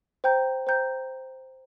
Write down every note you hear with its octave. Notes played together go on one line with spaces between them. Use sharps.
C5 G5 A#5 G6
C5 G5 A#5 G6